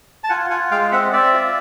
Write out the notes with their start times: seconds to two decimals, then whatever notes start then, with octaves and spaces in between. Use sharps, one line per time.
0.24 A5
0.29 F4 F#5 G#5
0.50 F4 F#5 G#5
0.71 G#3 F5 G5
0.92 C4 E5 F#5
1.13 C4 D5 E5
1.34 F4